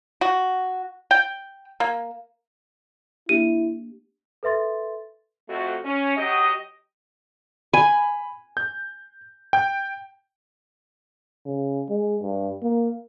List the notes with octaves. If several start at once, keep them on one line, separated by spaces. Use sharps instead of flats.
F#4
G5
A#3
A#3 D4 E4 G4 D#7
A4 B4 E5 C6 A6
F2 A3 F#4
C#4
F#3 F#4 G4 D#5
G#5 B5
G6
G5 G6
C#3
G#3
G2
A#3